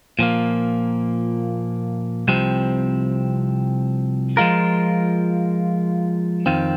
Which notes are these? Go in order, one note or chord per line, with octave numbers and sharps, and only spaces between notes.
A#2 F3 A#3
C2 C3 F3 C4
F3 G#3 F4 A#4
F2 D#3 C4 F4